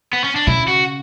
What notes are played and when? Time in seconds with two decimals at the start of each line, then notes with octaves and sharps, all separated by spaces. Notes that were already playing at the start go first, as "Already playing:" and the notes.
0.13 B3
0.24 C#4
0.36 D4
0.47 C#3 E4
0.68 F#4